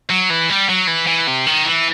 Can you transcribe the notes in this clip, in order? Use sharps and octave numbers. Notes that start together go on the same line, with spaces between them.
F#3
E3
G3
F#3
E3
E3
C3
D#3
E3